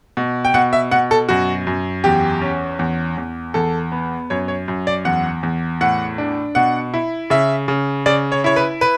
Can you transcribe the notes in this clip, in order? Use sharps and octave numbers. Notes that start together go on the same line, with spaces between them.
B2
G5
B2 F#5
E5
B2 F#5
A4
F#2 F#4
F#2
E2 G4
C#4
E2
E2
E2 A4
B3
F#2 C#5
C#5
F#2
D5
E2 F#5
E2
A2 F#5
D4
B2 F#5
E4
C#3 E5
C#3
C#3 D5
C#5
E4 C#5
B4
B4